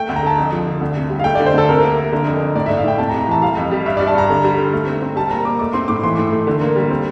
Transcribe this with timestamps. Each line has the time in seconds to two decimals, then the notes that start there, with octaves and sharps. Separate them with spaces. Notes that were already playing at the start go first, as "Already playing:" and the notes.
Already playing: A3 G5
0.09 D2
0.16 A#5
0.23 D3 A5
0.38 F2
0.52 F3
0.66 D3
0.81 D2
0.96 C3
1.10 G3
1.19 F5
1.24 A3 G5
1.35 D3 D5
1.46 C5
1.54 D2 A4
1.69 C3 A#4
1.83 A#3
1.97 A#3
2.12 D3
2.27 F2
2.40 F2
2.55 A2 D5
2.66 A2 E5
2.77 F5
2.84 A2 G5
2.98 C3 A5
3.09 A#5
3.14 C3
3.21 A#5
3.28 E3 A5
3.42 G3 F5
3.57 F2
3.71 G3
3.86 G2 E5
3.97 G2 D5
4.08 A5
4.15 G2 A#5
4.30 D3
4.44 G3
4.58 D3
4.73 A3
4.87 C4
5.02 C4
5.16 G3 A5
5.30 A#2 A#5
5.45 A#3 D6
5.59 A3 D6
5.73 C4 C6
5.88 A2 D6
6.03 E3 C6
6.18 A2
6.32 A3
6.47 D3
6.61 A#3
6.76 G3
6.91 C4